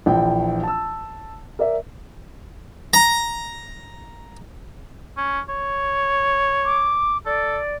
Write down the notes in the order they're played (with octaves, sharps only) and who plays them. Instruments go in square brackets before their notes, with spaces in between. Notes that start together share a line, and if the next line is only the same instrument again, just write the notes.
[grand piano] A#1 E3 F3 G5
A5 E6
A#4 D5 E5
[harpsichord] A#5
[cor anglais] C#4
C#5
[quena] D6
[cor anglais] A4 [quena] D5